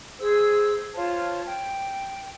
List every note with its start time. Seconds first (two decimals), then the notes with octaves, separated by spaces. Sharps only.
0.19 G#4 C5 E6
0.94 F4 C5 C#5 A5
1.46 G5